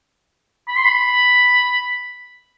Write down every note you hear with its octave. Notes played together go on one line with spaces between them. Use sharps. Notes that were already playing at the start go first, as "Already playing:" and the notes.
B5
C6
B5